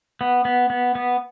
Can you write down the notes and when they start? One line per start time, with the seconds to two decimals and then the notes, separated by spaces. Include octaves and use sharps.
0.21 B3
0.45 B3
0.70 B3
0.95 B3